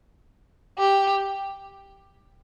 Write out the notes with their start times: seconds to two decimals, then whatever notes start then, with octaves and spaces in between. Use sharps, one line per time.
0.79 G4